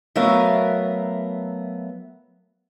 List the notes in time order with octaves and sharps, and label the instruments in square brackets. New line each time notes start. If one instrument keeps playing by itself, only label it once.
[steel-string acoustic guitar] F#3 A3 B3 A#4 E5 F5